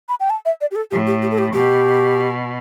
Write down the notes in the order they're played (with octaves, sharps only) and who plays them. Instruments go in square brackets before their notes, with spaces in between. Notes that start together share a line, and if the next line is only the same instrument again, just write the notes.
[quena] B5
G5
A5
E5
D5
G4
A4
[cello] A2 [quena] G4
[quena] G4
G4
A4
G4
[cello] B2 [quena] G4